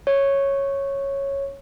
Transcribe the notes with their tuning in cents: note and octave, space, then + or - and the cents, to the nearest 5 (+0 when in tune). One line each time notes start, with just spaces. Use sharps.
C#5 -5